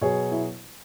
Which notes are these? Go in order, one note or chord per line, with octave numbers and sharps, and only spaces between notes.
B2 F#3 G#4 C#5
E4